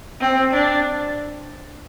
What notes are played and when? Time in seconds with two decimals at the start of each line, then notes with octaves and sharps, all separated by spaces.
0.21 C4
0.53 D4